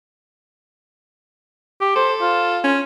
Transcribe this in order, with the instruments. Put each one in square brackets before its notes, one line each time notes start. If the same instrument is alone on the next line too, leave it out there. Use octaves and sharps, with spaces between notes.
[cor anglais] G4
[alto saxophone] A4 [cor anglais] C5
[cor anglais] F4
[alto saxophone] C#4